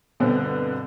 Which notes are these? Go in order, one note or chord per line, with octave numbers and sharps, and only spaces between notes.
G1 B2 D3 B3 C4